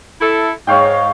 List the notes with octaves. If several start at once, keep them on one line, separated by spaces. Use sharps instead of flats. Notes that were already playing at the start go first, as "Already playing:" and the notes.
E4 A4
G#2 C#5 F5 G5